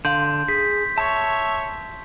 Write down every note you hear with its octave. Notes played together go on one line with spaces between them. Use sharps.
D3 F5 C6 G6
G#4 B6
C#5 E5 A5 C#6